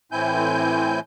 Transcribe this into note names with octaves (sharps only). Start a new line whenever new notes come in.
A2 E3 C4 E4 G#5 G6